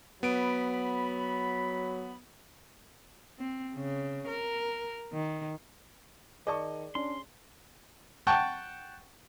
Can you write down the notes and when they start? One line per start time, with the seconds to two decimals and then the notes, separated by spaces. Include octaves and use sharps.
0.23 F#3 B3 B5 D7
3.39 C4
3.75 C#3
4.28 A#4
5.13 D#3
6.47 D#3 G#4 D5 D#5 A5 C#6
6.95 C#4 D4 C6
8.27 F#5 G5 A5 C#6